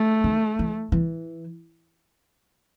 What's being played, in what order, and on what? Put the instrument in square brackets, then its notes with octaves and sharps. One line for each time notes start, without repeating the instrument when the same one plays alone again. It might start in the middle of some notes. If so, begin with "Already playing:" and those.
Already playing: [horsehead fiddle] A3
[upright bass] D#3
E3
E3